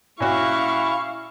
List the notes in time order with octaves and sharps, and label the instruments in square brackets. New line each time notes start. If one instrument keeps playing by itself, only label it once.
[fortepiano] A#2 C#4 F#4 [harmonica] E4 [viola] F5 C#6